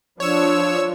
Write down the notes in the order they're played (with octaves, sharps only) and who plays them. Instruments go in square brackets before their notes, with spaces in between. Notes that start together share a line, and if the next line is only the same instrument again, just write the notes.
[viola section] F3 D4 [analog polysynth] C#5 E6